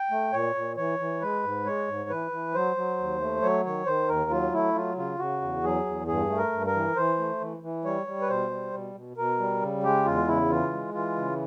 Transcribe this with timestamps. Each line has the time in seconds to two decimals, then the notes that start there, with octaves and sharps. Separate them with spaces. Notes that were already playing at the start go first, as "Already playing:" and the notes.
Already playing: G5
0.11 A3
0.33 A#2 C#5
0.55 A#2
0.77 E3 C#5
0.99 E3
1.21 G#3 B4
1.44 G#2
1.65 G#3 C#5
1.88 G#2
2.10 E3 B4
2.31 E3
2.54 F#3 C5
2.76 F#3
2.98 D#2
3.20 A3
3.42 F#3 C#5
3.65 D#3 C#5
3.86 D#3 C5
4.09 D#2 A#4
4.31 F#3 F4
4.52 A3 E4
4.75 F#3 F4
4.97 C#3 F4
5.19 C#3 F#4
5.41 E2
5.64 F#3 G#4
5.86 E2
6.08 G2 G#4
6.30 A3
6.37 A#4
6.52 G2
6.67 A#4
6.74 E3
6.96 E3 C5
7.18 A3
7.40 E3
7.63 E3
7.85 G3 C#5
8.07 G3
8.22 B4
8.29 B2 C5
8.51 G3
8.74 B2
8.95 B2
9.17 B2 A#4
9.39 G3
9.61 C#3
9.83 G#3 G4
10.06 E2 F4
10.28 C#3 E4
10.50 E3 F4
10.72 G#3
10.94 E3 F4
11.16 C#3